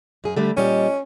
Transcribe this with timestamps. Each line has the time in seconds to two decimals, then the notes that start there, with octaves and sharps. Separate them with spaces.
0.24 F#2 G#4
0.37 D3 G3 A3
0.57 A#2 G3 C#4 D#5